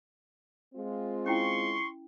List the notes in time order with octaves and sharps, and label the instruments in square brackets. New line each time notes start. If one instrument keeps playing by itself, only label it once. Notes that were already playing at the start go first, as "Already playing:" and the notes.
[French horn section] G#3 C4 F4
[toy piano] C#4 E4 G5 [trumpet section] C6 C#6